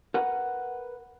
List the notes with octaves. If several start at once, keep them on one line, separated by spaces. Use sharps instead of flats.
A#4 B4 F#5